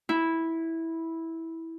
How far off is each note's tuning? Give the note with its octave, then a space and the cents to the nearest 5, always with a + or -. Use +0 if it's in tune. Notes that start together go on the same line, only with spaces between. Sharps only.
E4 -10